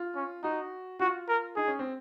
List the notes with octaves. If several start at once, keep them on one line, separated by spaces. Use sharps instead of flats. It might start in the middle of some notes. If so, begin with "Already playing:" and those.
Already playing: F4
C#4
D#4 F#4
F4 F#4
A#4
D#4 G#4
C#4
C4